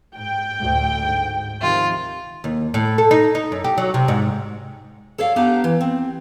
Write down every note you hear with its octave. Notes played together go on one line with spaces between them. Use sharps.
G#2 G5
D2 A2
G#2
C3 D#3 F3 F4
D#2
A2
A4
D#4
D#4
F#2
G4
F#3
C3
G#2
A4 C#5 D5 F5
B3 D4 D#4 G4 F5 A#5
E3
C4